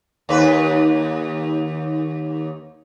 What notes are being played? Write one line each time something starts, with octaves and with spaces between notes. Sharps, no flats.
D#2 B4